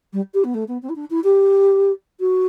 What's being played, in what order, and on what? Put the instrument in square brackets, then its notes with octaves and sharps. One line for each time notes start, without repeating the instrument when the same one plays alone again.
[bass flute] G3
G4
B3
A3
B3
C4
E4
D4
E4
G4
F#4